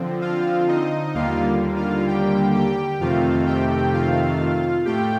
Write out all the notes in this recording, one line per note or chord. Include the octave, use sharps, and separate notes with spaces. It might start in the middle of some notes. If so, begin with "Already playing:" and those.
Already playing: D3 F3 C4
F4 F5
D#4 D#5
D#2 D3 G3 A#3 F4 F5
F4 F5
G4 G5
G4 G5
F2 C3 D#3 A3 C4 F4 F5
G4 G5
F4 F5
A2 A3 G4 G5